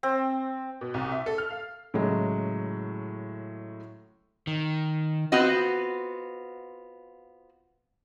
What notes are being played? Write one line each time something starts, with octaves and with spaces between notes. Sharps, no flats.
C4
B2
C2
E5
A4
F6
F5
A2 C#3 F#3 G#3
D#3
B3 C4 F4 F#4 D#5